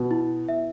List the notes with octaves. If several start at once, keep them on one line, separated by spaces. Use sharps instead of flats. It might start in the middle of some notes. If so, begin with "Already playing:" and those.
Already playing: B2 B4
E4
E5